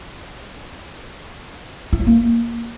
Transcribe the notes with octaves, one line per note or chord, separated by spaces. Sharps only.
E4
F#3
A#3